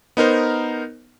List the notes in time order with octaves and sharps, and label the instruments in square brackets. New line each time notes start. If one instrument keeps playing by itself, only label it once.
[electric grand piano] B3 D#4 A#4 C5